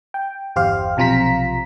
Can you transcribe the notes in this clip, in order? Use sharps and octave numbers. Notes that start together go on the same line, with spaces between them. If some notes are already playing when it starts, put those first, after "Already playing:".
G5
G1 E2 G4 C5 F5
B1 C3 F3 F4 A#5 B6